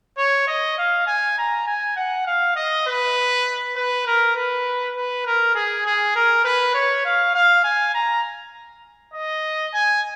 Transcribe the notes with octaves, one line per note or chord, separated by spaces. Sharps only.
C#5
D#5
F5
G#5
A#5
G#5
F#5
F5
D#5
B4
B4
A#4
B4
B4
A#4
G#4
G#4
A#4
B4
C#5
F5
F5
G#5
A#5
D#5
G#5